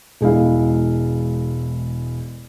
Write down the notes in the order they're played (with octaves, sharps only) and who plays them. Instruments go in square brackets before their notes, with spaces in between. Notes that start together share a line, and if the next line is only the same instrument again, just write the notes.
[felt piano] E1 G#3 E4 F5